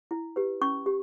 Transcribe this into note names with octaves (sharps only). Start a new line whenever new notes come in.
E4
G4 B4
C#4 C#6
G4